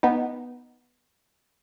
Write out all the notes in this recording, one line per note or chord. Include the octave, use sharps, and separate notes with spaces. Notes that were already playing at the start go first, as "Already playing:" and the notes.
B3 D#4